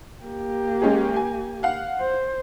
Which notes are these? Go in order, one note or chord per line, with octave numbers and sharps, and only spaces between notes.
A#3 G4
G#3 C#4 G#4
G#5
F5 F#5
C5